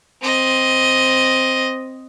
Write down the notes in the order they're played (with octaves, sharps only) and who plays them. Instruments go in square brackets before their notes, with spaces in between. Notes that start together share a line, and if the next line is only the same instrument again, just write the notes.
[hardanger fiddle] C4 D#5